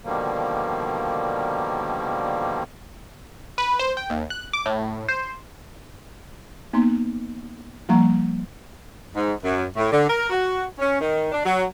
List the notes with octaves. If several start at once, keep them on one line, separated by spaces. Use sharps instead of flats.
B2 D3 D#3 F3 G3 A#3
B4
C5
G5
D#2
F#6
D6
A2
C5
A#3 B3 D#4 C6
F3 G3 A#3 F#5 A#5 C#6
G#2
F#2
A2
D3
A#4
F#4
C#4
D#3
D4
F#3